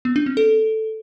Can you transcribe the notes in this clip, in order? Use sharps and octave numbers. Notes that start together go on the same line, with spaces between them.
B3
D4
C4
A4